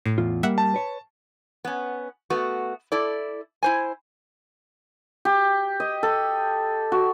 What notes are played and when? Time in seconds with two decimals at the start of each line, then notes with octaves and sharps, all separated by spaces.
0.06 A2
0.18 E2 F4
0.43 G3 A#3 E5 F#5
0.58 A5
0.74 B4 C#5
1.65 B3 C#4
2.30 A3 B3 F#4
2.92 E4 A4 D5
3.63 E4 C5 G#5
5.25 G4
5.80 D#5
6.03 A4
6.92 F#4